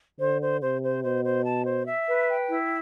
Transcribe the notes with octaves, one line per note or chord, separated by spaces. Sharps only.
D3 C5
C5
C3 C5
C5
B2 C5
C5
A5
C5
E5
B4
G5
E4